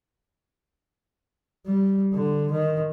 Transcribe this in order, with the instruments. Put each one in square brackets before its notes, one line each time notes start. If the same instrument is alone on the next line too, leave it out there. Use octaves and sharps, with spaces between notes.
[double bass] G3
D3
D#3